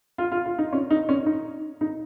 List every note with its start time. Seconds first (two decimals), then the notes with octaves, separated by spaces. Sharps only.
0.18 F4
0.32 F4
0.45 F4
0.59 D#4
0.73 C#4
0.91 D#4
1.09 C#4
1.26 D#4
1.81 D#4